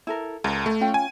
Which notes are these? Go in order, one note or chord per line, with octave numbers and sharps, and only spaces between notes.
E4 A4 A#4
C#2 A#4 D#5
A3
C#4 F4 G5
G#5